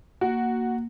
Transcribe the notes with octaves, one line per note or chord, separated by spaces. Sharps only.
A#3 F#4